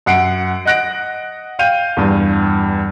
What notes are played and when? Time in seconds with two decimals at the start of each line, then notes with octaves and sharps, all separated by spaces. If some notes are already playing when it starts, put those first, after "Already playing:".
0.06 F#2 F#5 C7 D7
0.65 D#5 F#5 F#6 A#6 D7
1.59 F5 G5 G6 D#7
1.97 E2 G2